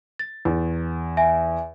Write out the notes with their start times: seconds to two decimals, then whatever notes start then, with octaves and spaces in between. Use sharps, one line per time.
0.19 A6
0.45 E2
1.17 E5 G#5